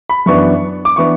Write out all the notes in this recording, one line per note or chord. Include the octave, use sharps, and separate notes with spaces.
B5
F#2 E3 B3 D4 C#6
D6
E3 B3 D4 C#6